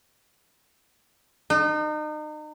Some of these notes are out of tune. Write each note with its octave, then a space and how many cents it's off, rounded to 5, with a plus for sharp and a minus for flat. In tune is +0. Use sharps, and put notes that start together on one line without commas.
D#4 -35